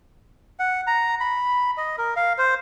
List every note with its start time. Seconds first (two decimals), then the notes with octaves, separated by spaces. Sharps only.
0.59 F#5
0.87 A#5
1.20 B5
1.77 D#5
1.98 A#4
2.16 F5
2.38 C5